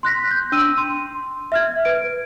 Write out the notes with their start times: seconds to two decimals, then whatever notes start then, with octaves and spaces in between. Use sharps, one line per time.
0.03 C6 F#6 A#6 B6
0.31 G6
0.52 D4 E6 D#7
0.78 C6
1.52 E5 F6 G#6
1.85 B4 D7